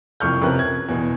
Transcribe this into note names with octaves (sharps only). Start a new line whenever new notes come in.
C2 F2 E4 C#6 F6 G6
F2 C3 C#4 A#4 B4 F#6
G#6
E2 B2